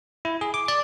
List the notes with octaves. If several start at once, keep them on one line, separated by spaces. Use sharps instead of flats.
E4
G#4
D6
D5